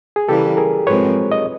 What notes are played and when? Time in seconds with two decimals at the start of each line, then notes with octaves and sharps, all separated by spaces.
0.16 G#4
0.28 C#3 E3 G3 A#3 G4 A4
0.57 G#4 A#4
0.87 G#2 F3 G#3 C4 B4 C#5
1.32 D#5